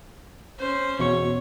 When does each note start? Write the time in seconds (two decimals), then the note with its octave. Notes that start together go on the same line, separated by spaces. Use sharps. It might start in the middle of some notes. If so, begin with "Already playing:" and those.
0.59 C#4 C5
0.99 E2 B2 C#5 C#6